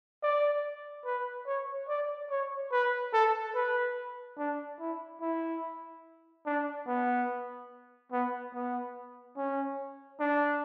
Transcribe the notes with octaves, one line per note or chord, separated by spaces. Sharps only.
D5
B4
C#5
D5
C#5
B4
A4
B4
D4
E4
E4
D4
B3
B3
B3
C#4
D4